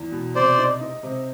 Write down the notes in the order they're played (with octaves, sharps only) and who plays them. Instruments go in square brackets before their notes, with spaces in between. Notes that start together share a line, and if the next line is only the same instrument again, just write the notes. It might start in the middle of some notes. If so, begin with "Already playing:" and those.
Already playing: [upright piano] E2
B2
[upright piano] C3 [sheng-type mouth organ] C5 D5
[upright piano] D#4
D#4
C3